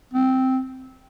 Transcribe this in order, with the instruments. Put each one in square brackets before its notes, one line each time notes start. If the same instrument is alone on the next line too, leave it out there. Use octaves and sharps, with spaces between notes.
[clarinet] C4